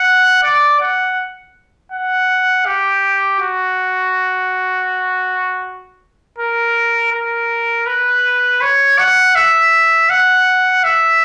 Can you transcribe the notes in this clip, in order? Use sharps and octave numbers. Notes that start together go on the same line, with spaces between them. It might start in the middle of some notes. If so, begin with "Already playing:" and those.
Already playing: F#5
D5
F#5
F#5
G4
F#4
A#4
A#4
B4
C#5
F#5
E5
F#5
E5